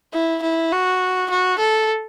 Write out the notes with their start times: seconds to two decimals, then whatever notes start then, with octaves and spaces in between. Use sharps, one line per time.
0.13 E4
0.42 E4
0.72 F#4
1.30 F#4
1.59 A4